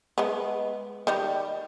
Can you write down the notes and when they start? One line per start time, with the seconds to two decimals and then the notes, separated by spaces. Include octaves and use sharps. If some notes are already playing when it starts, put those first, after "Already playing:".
0.18 G#3 B3
1.07 D#3 G3